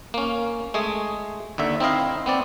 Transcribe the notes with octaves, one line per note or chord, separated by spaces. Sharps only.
A#3 C#4
G#3 A3 G#4
D#2 D3 E5
C4 D#4 E4 D#5 F5
B3 C4 D5